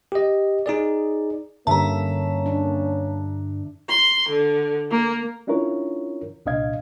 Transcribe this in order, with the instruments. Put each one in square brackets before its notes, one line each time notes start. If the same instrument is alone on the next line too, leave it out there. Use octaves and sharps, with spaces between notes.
[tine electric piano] G4 D#5
D#4 G#4 D5
[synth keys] G2 [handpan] D3 E5 [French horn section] A#3 C#4 [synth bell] A5 A#5
[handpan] D4
[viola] C6
D3
A#3
[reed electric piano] C#4 D4 E4 F4 A#4 C#5
C2 A#2 D4 D#5 F5 G#6